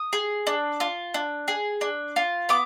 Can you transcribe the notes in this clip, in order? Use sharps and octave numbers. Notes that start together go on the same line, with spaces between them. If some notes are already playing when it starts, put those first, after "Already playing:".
Already playing: D#6
G#4
D4
F4
D4
G#4
D4
F4
B3 D6